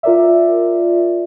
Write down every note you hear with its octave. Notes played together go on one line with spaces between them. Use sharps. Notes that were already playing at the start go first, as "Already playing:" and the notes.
F4 A#4 D5 E5